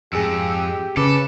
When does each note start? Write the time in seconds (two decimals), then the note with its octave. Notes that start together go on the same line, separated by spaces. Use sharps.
0.13 F2 G#2 G4 G#4 E6
0.97 C#3 A4 B4 D6